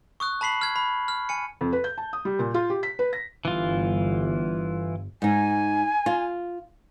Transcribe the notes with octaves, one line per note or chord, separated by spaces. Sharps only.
C#6 D#6 F#6
A5 B5 B6 C7 F#7
F6 G#6
B5
F6
G#5 C#7
F2
B4
G6
A5
D#6
G3
A#2
F4
G4
B6
B4
A#6
G1 E3 F4
G#2 D#4 G#5
F4